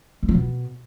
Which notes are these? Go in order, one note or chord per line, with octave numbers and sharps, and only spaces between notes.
G#3
F3
B2